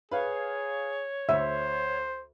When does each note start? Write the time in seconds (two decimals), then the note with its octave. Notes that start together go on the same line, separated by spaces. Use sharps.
0.11 G#4 B4 C#5 F5
1.29 D2 C5 E5